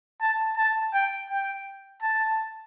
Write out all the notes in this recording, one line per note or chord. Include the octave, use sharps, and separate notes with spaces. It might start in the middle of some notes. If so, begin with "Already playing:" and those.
A5
A5
G5
G5
A5